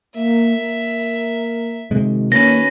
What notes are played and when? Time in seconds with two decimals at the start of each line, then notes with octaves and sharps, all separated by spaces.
0.16 A#3 E5
0.55 A#3 A#4
1.91 C3 D#3 G#3 F#4
2.32 A#3 C#4 B4 A#6